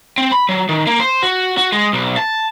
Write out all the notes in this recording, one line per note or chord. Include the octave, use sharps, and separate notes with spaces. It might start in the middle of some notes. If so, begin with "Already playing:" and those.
C4
B5
F#3
D#3
A#3
C5
F#4
F#4
G#3
B1
A5